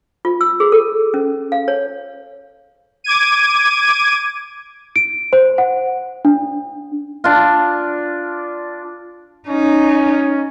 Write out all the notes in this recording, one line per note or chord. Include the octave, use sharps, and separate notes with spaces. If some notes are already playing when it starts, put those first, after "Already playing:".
F4
E6
G#4
A4
C#4
F5
C#5
D6 G#6 D#7
D7
C5
F#5
D4
D4 F4
C#4 D#4